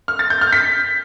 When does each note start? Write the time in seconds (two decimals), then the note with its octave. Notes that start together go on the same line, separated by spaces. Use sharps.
0.08 F6
0.19 A6
0.30 G6
0.41 F6
0.53 B6